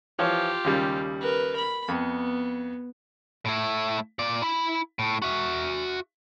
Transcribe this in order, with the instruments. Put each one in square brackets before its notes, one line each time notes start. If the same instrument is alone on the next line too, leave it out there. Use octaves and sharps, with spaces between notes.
[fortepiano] E3 F3 C#5 [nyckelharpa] F4 G4
[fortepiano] D#2 C#3 G3
[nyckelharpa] A#4 B4
B5
[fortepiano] F2 [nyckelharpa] B3
[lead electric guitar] A2 E4
A#2 D5
E4 B5
A2
F#4 E5